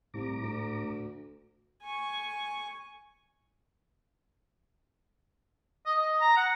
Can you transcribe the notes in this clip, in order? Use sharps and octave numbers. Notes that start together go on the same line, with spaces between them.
C2 A2 A#5 D6
D2
G#5 C#6
D#5
D#5
A#5
F#5